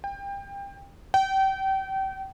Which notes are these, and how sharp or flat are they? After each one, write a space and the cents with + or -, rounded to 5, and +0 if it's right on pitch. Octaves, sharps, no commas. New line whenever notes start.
G5 +25
G5 -30